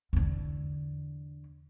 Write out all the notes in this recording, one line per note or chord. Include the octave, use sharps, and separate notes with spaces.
E2 D3